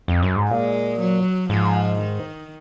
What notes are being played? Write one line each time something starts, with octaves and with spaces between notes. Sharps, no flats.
F2
F#2
G#2
A#2 G#3
F#3
G#2 F3
D#3